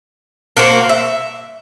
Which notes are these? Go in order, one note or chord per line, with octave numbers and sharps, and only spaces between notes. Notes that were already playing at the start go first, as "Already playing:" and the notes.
A#3 F#4 A#4 C5
E5